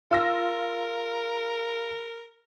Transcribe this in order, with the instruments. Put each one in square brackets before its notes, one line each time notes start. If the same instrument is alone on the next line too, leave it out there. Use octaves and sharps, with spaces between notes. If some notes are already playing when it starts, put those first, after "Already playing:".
[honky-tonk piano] F4 E6 A#6 [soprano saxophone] A#4